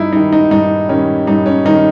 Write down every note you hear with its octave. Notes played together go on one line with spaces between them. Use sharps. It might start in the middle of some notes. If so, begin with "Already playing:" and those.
Already playing: G2 D#4 E4
D#3 G3 D#4
D#4
G2 D#4
D#3 G3 C#4
G2 D#4
C#4
D#3 G3 D#4